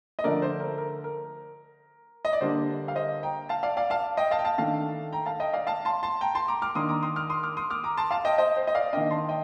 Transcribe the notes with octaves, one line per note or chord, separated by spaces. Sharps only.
D#5
D3 F3 A3 D4 A#4 D5
C5
A#4
A#4
A#4
D#5
D5
D3 G3 A#3 D4 C5
F5
C5 D#5
G5 A#5
F5 A5
D5 F5
D5 F5
F5 A5
D#5 G5
F5 A5
G5
F5 A5
D#3 A3 D4 F5 A5
G5 A#5
F5 A5
D#5 G5
D5 F5
F5 A5
A5 C6
A5 C6
G5 A#5
A5 C6
A#5 D6
D6 F6
D#3 A#3 D4 C6 D#6
A#5 D6
C6 D#6
D6 F6
C6 D#6
D6 F6
C6 D#6
D6 F6
A#5 D6
A5 C6
F5 A5
D#5 G5
C5 D#5
C5
D#5
D5 F5
D#3 A#3 D4 D#5 G5
A5 C6
D#5 G5